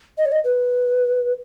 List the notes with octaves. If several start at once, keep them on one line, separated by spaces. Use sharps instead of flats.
D#5
C#5
D#5
B4